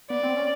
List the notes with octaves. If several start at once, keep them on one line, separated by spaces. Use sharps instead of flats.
B3 D5
C4
C#4